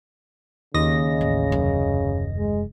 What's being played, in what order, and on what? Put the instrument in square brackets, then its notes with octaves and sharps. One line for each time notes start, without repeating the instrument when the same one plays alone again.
[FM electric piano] D#2 D#5 A#6 [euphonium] C#3
[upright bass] A1
F1 F#2
[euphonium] G#3